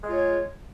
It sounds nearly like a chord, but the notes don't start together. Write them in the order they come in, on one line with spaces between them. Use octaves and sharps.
G#3 F4 C#5